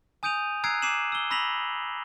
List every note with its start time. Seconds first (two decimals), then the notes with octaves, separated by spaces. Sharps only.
0.23 G#5 D#6 G6 D7 D#7 F7
0.64 A#5 E6 F#6 G#6 C7 D7
0.82 D6 C7 D#7 E7 F#7
1.12 E6 G7
1.31 B5 E6 A#6 B6 F7 F#7